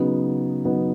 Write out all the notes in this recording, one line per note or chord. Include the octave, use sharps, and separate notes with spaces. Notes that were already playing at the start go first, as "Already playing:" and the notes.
Already playing: C#3 F#3 B3 D#4
C#3 F#3 B3 D#4